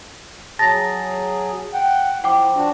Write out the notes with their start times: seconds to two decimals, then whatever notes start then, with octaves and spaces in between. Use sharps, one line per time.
0.59 F#3 G#4 A5 A6 A#6
1.73 F#5 G5
2.24 F3 E4 F#5 G5 D6
2.55 F3 D4 F#4